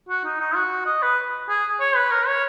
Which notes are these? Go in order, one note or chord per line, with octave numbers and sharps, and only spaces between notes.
F#4
D#4
D#4
F#4
D#5
B4
G#4
C#5
B4
A#4
C#5